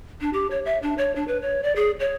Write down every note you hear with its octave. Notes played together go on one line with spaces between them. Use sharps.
D4
G4
C#5
E5
D4
C#5
D4
B4
C#5
D5
G#4
C#5